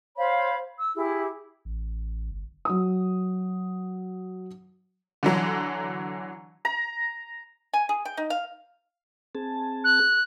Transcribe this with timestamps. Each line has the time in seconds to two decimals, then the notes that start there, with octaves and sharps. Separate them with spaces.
0.17 C5 C#5 F5 B5
0.77 E6
0.94 E4 G4 G#4
1.65 A1
2.31 G1
2.65 F#3 D#6
5.23 D3 E3 F#3
6.65 A#5
7.74 G#5
7.89 G#4
8.05 G5
8.17 D#4
8.30 F5
9.35 C4 G#4 A5
9.84 F#6